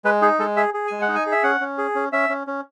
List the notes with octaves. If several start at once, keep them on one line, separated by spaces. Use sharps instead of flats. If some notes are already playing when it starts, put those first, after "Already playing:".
G#3 B4
D#4 G#4
G#3 A4
G#4 E5
G#4
G#3 G#5
F#5
D#4
G#5
G#4
E5
C#4 F#5
C#4
G#4
C#4
C#4 E5
C#4
C#4